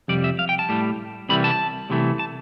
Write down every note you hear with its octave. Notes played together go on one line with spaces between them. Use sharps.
F2 C3 G3 D5
E5
F5
G5
A5
A2 G3
C2 C3 E3 G3 B5
A5
C2 C3 E3 A3
A5